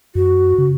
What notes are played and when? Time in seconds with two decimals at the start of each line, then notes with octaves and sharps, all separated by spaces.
0.15 F#2 F#4
0.58 C#3